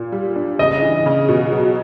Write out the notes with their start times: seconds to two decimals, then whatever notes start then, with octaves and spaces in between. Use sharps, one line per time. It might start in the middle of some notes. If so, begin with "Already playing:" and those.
Already playing: A#2
0.12 G3
0.36 D4
0.59 C#3 D#5
0.82 E3
1.06 C#3
1.29 B2
1.52 F#3